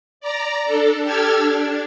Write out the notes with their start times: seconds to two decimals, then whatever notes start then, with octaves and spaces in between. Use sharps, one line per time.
0.20 D5 A#5
0.66 D4 A4
1.02 G4 A4 E6 F6 G#6
1.34 D4